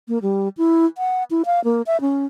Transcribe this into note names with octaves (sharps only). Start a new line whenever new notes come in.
A#3
G3
E4
F#5
E4
F5
A#3
E5
C#4